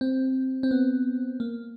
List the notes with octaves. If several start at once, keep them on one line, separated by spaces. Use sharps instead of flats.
C4
C4
B3
A#3